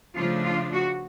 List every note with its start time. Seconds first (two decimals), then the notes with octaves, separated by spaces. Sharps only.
0.15 C#3 F3 A3 D4 F4
0.44 F4
0.73 F#4